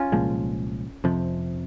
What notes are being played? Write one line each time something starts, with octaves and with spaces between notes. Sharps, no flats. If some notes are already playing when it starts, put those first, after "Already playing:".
Already playing: C#4 F4
C2 A#2 F3 G#3
F2 C3 F3